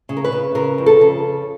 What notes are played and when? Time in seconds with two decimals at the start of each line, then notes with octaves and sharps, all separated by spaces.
0.09 C#3
0.17 A#4
0.24 B4
0.32 C#3
0.55 C#3 A#4
0.78 F2
0.86 A4
1.01 C#3